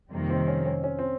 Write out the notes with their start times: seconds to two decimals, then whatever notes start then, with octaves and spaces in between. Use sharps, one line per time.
0.12 F2 C3 D#3 G3 A#3
0.30 C4
0.48 C#4
0.66 C#4
0.84 C#4
0.99 C4